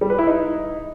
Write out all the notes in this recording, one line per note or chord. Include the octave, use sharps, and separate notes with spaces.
G3
B4
E4
D#4